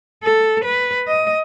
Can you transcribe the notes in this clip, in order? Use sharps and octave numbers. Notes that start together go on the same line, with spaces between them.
A4
B4
D#5